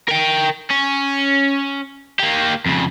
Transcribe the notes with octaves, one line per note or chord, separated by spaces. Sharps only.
A#4 G5
C#4
A#3 G4
F2 C#3